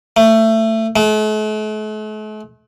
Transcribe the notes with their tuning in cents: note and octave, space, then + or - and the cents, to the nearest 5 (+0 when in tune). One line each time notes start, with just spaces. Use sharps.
A3 +20
A3 -45